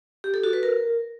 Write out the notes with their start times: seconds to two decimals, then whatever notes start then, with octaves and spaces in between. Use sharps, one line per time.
0.24 G4
0.34 A4
0.44 F#4
0.53 B4
0.63 A#4